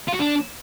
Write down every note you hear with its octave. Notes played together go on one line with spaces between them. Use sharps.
F4
F#4
D4